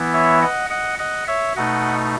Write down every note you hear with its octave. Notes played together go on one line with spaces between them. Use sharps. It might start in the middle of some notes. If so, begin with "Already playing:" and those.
Already playing: E3 B3 E4
C#5 E5
D#5 F#5
D#5 F#5
D#5 F#5
C#5 E5
B2 A3 D#4 D#5 F#5